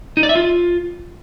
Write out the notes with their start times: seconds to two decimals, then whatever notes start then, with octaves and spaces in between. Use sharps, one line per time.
0.17 D#4
0.23 D5
0.29 E5
0.35 F4